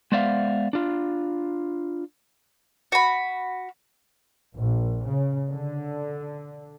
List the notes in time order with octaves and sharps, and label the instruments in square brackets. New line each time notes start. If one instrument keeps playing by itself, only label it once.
[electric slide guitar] G#3 B3 C5 D5 E5 F5
D4 F4
[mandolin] F#4 B5
[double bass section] A#1
C#3
D3